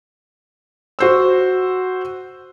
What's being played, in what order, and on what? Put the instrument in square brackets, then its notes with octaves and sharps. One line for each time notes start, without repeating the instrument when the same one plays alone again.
[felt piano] F#4 C5 E6